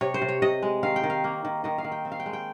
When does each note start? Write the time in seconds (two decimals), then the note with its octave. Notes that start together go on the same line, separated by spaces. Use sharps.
0.01 C3 C#5
0.14 C5
0.22 C3
0.28 C#5
0.42 C3 D#5
0.63 G#3
0.83 D#3 F5
0.96 G5
1.04 D#3
1.10 F5
1.24 A#3
1.45 D#3
1.64 D#3 D#5
1.78 F5
1.84 D#3
1.92 G5
2.05 C4
2.12 F5
2.20 G5
2.26 G#3
2.33 G5